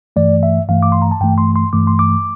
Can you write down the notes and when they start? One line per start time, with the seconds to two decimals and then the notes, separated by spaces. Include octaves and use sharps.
0.16 G2 E3 A3 D5
0.43 E5
0.69 G2 E3 A3 F5
0.83 D6
0.92 C6
1.02 A#5
1.11 A5
1.21 G2 E3 A3 G5
1.38 C6
1.56 C6
1.73 G2 E3 A3 D6
1.87 C6
1.99 D6